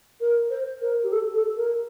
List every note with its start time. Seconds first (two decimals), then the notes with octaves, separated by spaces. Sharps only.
0.20 A#4
0.50 C5
0.81 A#4
1.03 G4
1.12 A4
1.34 A4
1.57 A#4